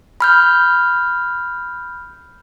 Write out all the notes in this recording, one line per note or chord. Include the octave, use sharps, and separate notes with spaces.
B5 F6 G6